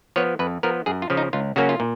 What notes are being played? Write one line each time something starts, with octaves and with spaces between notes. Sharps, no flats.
F3 B3 C#5
F2 B4
F3 B3 A#4
F#2 G#4
F4
C#3 F3
D#4
C#2 F4
C#3 F#3 A#3 C#4 F#4
F4
A#2